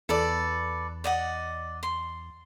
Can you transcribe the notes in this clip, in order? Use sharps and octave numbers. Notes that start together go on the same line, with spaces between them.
E2 A4 B4 D5
D5 D#5 F#5
C6